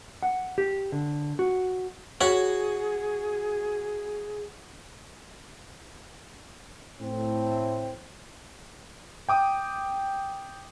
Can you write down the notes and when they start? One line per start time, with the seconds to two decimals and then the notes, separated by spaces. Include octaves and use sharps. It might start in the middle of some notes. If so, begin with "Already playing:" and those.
0.23 F#5
0.58 G4
0.92 D3
1.39 F#4
2.21 F#4 G#4 C#5 B5
7.01 A2 C4
9.29 G5 D6 D#6